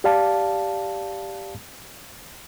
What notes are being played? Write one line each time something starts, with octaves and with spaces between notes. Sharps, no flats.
G4 D5 F5 A5